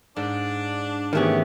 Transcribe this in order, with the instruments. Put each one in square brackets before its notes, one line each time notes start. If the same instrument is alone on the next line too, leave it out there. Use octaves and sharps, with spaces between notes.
[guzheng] G#2 [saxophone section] D4
[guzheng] G#2 E3 [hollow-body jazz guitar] D#3 A3 G#4 [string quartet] B3 C#4 G4